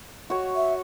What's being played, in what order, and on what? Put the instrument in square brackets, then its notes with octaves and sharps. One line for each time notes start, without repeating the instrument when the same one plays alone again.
[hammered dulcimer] F#4 C#5
[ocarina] E5